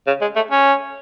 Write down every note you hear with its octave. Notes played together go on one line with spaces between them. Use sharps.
C#3
G#3
A3
C#4